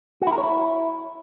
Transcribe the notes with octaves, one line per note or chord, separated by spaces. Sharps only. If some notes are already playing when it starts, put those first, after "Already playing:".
F#4
E4
A#4
C#5
E4